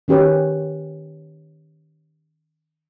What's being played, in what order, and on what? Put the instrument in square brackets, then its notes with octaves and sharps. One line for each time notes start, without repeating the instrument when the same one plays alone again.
[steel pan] D#3 C#4 G4 B4 C#5